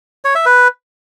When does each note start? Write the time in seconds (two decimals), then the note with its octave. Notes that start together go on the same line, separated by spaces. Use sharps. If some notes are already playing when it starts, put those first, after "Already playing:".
0.25 C#5
0.35 E5
0.46 B4